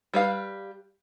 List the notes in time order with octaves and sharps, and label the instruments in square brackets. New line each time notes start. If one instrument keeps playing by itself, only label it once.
[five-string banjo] G3 B4 F5